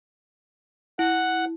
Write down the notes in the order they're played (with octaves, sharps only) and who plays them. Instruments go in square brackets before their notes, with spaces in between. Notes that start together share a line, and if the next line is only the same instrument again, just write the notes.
[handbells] E4 [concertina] F#5